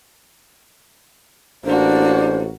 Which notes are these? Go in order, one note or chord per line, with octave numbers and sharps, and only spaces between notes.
A1 A#3 D4 F#4 C5